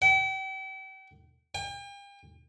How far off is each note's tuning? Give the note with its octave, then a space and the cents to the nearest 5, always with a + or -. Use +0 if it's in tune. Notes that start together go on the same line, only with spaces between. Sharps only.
G5 -40
G5 +40